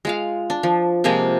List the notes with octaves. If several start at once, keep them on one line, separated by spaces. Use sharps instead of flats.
G#3 F4 F5
D4
F3
C3 F3 G#3 A#3